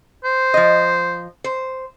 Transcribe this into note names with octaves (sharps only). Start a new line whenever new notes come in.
C5
F3 D#5
C5